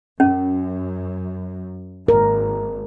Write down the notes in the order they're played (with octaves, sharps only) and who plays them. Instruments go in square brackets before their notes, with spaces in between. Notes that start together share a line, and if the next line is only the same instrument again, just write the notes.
[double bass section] F#2 [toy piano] C#4
[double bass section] G#1 [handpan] A#4